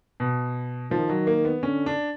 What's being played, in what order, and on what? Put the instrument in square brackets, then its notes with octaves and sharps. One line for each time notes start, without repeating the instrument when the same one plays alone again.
[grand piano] B2
[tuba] D#3 [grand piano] F3
[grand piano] F#3
A#3
B3
[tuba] D3 [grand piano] C#4
[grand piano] D4